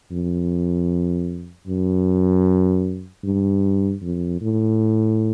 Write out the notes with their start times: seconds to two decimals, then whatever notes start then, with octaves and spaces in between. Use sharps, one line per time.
0.11 F2
1.67 F#2
3.23 G2
4.02 F2
4.41 A2